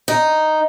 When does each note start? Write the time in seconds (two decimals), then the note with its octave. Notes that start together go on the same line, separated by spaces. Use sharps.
0.08 D#4